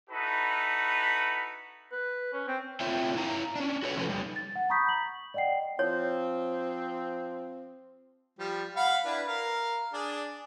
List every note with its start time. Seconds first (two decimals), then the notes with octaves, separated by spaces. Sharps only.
0.10 D#4 E4 F#4 A4 B4 B5
1.92 B4
2.33 C#4
2.48 C4
2.80 A3 C4 F4 C#5 E5 G5
3.17 E4 F5 A#5
3.56 C#4 D4
3.83 F#4 A4 B4 C#5
3.96 C3 F3 A3 C#4 A4 B4
4.09 G3 D#4
4.36 A6
4.56 F#5
4.70 A#5 B5 C#6 D#6 G6 B6
4.89 F#7
5.34 D5 D#5 F#5 G5 C7
5.79 F3 C4 C#5
8.39 F3 G3
8.76 F5 F#5 B5
9.05 D4 E4 B4
9.27 A#4 F5
9.93 D4 G#4 D5